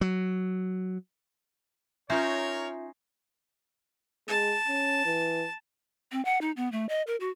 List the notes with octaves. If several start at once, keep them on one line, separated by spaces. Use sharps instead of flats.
F#3
C#4 D#4 F4 A#4 C5 C#5 E5
G#3 A5
C#4
E3
C4
F#5
D#4
B3
A3
D#5
A#4
F#4